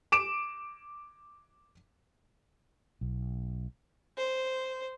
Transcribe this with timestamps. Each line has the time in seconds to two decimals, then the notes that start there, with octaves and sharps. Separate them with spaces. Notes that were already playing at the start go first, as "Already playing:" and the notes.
0.12 D6 D7 E7
3.01 B1
4.17 C5